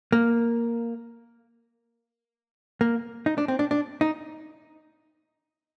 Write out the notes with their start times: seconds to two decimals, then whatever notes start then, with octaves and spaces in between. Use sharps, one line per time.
0.12 A#3
2.81 A#3
3.26 D#4
3.38 D4
3.48 C4
3.59 D4
3.71 D4
4.01 D#4